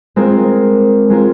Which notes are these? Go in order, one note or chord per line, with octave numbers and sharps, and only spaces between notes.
G#3 C4 F4 A#4
G#3 C4 F4 A#4